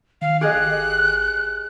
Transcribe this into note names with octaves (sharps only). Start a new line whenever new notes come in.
D#3 F5
G4 G#4 D#5 F#6
G#1